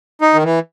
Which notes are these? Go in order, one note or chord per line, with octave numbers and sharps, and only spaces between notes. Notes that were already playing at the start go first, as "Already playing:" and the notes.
D#4
D#3
E3